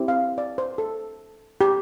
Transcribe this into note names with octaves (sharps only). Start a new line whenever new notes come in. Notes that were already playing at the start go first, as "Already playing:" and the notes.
Already playing: C4 E4 G4
F5
D5
C5
A4
G4